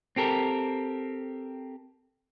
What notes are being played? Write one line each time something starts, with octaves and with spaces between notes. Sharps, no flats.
C4 G4 A4 A#4